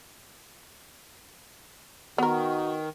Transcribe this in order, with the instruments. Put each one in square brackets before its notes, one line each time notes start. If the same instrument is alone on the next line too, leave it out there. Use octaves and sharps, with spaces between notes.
[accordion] D#3 [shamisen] B3 A#4 [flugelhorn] F#4